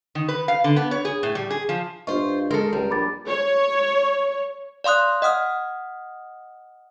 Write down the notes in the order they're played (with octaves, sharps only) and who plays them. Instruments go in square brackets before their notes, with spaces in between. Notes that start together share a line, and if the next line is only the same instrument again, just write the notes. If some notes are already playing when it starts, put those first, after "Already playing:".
[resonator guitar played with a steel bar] D#3
B4
F5
D3
B3
C#5
G#4
A2
G3
G#4
F3
[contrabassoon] G2 [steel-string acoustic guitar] F4 C5 [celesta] D#5 C#6
[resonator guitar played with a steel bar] G#3 A4 [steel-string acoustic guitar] A#4
[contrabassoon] C#2 [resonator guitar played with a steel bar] G3
[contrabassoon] A#1 [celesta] B5 D6 A6
[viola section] C#5
[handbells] D5 F5 C6 D#6 F#6
D#5 F#5 D#6 F6